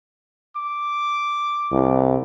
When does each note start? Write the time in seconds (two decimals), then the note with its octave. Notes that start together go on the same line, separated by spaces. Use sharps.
0.56 D6
1.72 C2